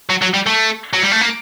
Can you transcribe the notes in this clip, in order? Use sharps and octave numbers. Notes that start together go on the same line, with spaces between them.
F#3
F#3
G3
A3
F#3
G3
A3
A#3